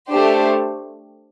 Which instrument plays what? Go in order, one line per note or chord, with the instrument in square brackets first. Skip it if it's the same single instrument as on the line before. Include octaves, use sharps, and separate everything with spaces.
[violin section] A3 D4 G4 C5